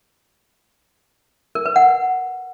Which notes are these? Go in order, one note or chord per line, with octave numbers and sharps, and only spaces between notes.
A#4
B4
F#5